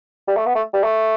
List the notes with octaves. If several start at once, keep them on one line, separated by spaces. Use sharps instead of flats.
G3
A3
B3
A3
G3
A3